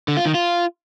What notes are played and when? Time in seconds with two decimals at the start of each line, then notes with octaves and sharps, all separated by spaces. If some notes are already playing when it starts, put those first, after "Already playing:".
0.08 D3
0.17 F4
0.26 D#3
0.34 F4